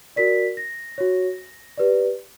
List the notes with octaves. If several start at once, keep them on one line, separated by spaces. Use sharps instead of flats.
F#4 A#4 D5 B6
A#6
F#4 C#5
G4 B4 D5